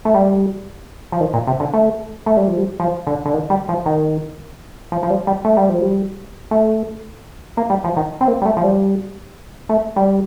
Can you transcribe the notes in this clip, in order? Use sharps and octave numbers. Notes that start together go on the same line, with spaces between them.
A3
G3
F3
D#3
A#2
C3
D3
A3
A3
G3
F3
G3
F3
D3
D3
D#3
G3
F3
D#3
F3
F3
G3
G3
A3
G3
F3
G3
A3
A#3
G3
F3
D#3
C4
A#3
G3
A3
F3
G3
A3
G3